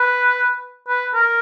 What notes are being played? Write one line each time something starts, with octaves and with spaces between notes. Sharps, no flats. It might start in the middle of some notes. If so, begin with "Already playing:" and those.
Already playing: B4
B4
A#4